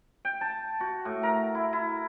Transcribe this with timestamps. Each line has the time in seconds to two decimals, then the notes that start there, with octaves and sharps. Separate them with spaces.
0.25 G5
0.41 A5
0.80 F#4
1.05 A2
1.23 A#4
1.55 E4
1.73 E4